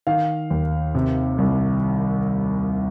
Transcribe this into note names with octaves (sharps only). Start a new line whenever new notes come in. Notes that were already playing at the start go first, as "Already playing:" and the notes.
D#3 F5
D#2
C3
C2